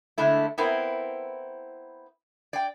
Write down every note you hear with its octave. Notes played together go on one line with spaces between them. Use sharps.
D3 G#3 A3 E4
B3 C4 E4 A#4
D5 G5